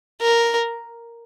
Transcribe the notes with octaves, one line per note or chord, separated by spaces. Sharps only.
A#4